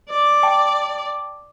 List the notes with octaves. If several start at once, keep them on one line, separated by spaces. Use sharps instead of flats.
D5
G5 A5 D6